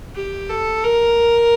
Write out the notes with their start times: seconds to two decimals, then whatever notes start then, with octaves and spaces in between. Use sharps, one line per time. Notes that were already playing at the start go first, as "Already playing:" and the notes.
0.15 G4
0.50 A4
0.84 A#4